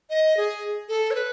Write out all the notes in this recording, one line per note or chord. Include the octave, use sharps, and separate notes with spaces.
D#5
G#4
A4
C#5
B4